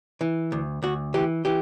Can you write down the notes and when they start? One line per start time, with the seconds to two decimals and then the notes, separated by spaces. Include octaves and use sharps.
0.21 E3
0.52 D2
0.82 D2 F#4
1.14 E3 G4
1.45 E3 G4